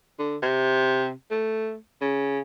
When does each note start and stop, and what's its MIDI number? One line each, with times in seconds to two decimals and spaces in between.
0.19 0.37 50
0.42 1.11 48
1.31 1.75 57
2.01 2.40 49